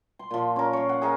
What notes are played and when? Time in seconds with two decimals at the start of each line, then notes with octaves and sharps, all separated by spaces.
0.19 C6
0.31 A#2 F3
0.56 C#4 A#4
0.73 C#5 F5
0.89 F#5
1.02 G#4 A#4 F5 G#5